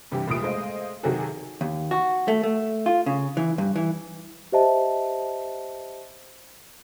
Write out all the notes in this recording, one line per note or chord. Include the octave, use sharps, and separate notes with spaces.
G2 C3 E3 E4 G4
F1 C2 A#2 D#6 D7
G#3 A3 C5 D#5 F5
C3 D#3 F#3 F#4 G#4 A4
D#2
F#4
A3
A3
F4
C#3
E3
G2
E3
G4 C5 D#5 E5 A5